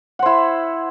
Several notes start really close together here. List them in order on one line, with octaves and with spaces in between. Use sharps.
F#5 C5 E4